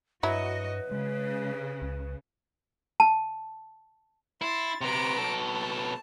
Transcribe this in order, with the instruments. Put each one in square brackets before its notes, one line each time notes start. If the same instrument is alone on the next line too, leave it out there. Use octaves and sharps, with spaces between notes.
[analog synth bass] G2 [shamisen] F#3 E4 [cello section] F#4 D#5 [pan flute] B4
[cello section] C#3 [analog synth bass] G#3
[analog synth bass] C#2
[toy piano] A5
[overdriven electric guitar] E4 [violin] C6 A6
[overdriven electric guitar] C3 B3 [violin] A#5 D7
[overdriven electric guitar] B2 A4
[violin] A5